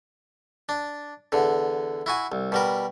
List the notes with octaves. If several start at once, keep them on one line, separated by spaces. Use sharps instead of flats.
D4
E2 D3
E4 F#4 G#5
C2
B2 G3 A#4